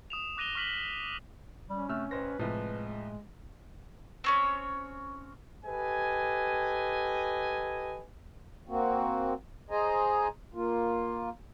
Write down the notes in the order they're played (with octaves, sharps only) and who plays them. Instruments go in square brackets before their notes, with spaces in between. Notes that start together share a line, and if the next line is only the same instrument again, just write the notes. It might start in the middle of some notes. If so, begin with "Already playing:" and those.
[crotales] D#6 E7 F7
D6 F#6 A#6 D#7 F7 G7
C#6 F6 B6 F#7 G7
[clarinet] G3 [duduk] C#4
[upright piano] C3 E6 F6 [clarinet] A3
[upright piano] A1 C5 A#6 [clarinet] B4
[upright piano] C2 F3 [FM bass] A2 [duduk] G#3
[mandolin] C4 C#4 C#5
[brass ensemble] G4 A4 B4 D#5 G#5
[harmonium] A#3 C4 F#4
G#4 C5 D#5 G#5 A#5
A#3 F4